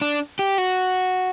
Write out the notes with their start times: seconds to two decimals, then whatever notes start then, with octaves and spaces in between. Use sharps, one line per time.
0.01 D4
0.39 G4
0.58 F#4